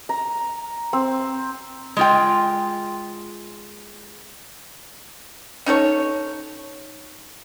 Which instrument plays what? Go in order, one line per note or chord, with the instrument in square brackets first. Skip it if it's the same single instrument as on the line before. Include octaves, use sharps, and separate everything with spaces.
[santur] A#5
C4
[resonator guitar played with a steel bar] G#3 F4 G5
[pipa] C#4 D#4 A4 C#5